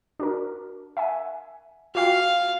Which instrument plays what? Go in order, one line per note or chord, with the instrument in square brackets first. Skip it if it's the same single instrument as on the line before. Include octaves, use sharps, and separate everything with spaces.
[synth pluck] D4 F#4 A#4
E5 F#5 G#5
[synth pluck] F4 F#4 G5 [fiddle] F5